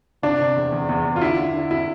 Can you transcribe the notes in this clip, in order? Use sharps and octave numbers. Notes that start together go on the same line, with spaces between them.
C3 D4
C3
E2
E2
E2
E2
F4
D3 E4
D3
D3
E4